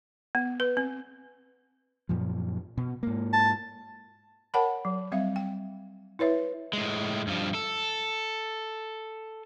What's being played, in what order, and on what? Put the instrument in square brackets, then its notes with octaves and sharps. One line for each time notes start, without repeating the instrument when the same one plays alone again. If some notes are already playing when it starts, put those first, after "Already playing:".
[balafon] B3
B4
C4
[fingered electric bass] F#2 A#2 F3
B2
G#2 A#3
[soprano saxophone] A5
[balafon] A#4 C#5 F#5 G5 A5 B5
F#3
G3 C4 E5 F5
G5
E4 B4 C#5 E5
[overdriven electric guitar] A2 G#3
G2 F3
A4